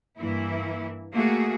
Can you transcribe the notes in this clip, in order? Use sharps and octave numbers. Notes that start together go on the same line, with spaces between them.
G2 E3 A#3 E4
A3 A#3 F#4 G#4